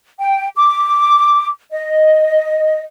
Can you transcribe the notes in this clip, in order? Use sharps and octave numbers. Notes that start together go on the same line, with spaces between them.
G5
D6
D#5